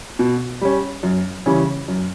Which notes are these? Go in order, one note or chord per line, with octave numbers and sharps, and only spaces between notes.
B2
G3 C#4
F#2
C#3 E3 G3 C#4
F#2